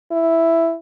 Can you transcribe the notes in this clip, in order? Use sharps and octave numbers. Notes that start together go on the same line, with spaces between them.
E4